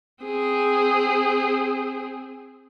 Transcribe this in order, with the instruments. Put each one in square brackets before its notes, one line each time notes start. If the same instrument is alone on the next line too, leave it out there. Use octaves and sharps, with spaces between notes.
[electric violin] C4 G#4